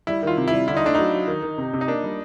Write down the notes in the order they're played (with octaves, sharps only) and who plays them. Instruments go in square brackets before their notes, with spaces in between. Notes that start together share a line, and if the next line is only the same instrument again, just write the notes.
[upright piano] G3 [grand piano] E4
[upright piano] D#3 [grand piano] F4
[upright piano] C3
[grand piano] E4
[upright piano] G3
[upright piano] D3 [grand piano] E4
[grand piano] D#4
[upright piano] A3 [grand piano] D4
[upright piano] F#3 [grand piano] D#4
[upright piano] F#3
D#3
D#3
C3
C3
[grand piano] D#4
[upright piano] A#3 [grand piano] D4
[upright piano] G3